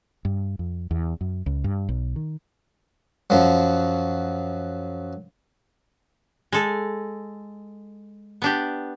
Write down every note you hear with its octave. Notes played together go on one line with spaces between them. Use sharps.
G2
F2
E2
F#2
C#2
G2
B1
D#3
F#2 F3 F#3
G#3 A4
B3 D4 G4